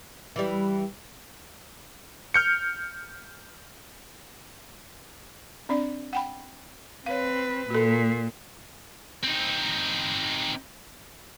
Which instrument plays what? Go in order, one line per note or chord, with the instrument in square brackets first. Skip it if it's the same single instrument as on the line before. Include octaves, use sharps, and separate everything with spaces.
[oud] E3 G3
[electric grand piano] F6 G6 C#7
[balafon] C4 D4 D5
F#5 G5 B5
[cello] C4 B4 [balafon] C#5 F5
[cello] A#2 [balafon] F#4 A4
[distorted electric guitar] C4 D#4